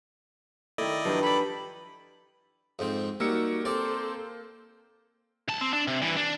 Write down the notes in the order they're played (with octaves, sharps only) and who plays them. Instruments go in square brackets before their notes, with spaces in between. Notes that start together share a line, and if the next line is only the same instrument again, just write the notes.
[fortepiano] D#3 A3 [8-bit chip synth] E4 D5 D#5
[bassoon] G2 [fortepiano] D#3 F3 F#3
[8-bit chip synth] A4 D5 [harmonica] B5
[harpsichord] F2 G#2 C4
[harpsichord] G3 [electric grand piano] A#3 E6 C#7 [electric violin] D#4 F#4
[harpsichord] C4 D5 [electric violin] A4 C5
[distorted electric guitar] C#2 A5
C4
D4
C3
G2 E3
D4